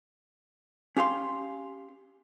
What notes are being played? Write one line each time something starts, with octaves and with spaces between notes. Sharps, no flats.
C#4 G4 F5 C6